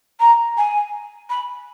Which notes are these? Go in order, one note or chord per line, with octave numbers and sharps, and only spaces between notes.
A#5
G#5
B5